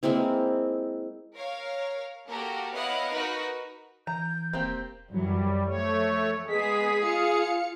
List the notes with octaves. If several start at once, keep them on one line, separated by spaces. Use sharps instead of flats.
G#3 A#3 C4 E4
A#4 C#5 F5
A#3 F#4 G4 A4 A#4
B3 E4 C#5 D#5 F5 F#5
D#4 F#4 A#4 B4
E3 A#5 G6
E1 A#3 C4 G4
F#2 E3 F#3 G3
F3 A3 C#5
G#3 B3 G#4 B6
F4 F5 C#7